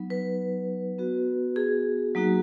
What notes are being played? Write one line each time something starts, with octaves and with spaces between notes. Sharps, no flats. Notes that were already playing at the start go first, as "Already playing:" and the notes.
Already playing: F#3 B3 D#4
B4
B3 F#4
G#4
F#3 A#3 D#4 F#4